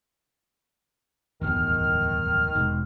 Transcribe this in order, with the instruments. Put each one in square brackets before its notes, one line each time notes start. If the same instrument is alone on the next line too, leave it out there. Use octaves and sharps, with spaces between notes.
[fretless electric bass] D1 G1 E2 [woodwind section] D#3 F6
[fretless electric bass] E1 G#2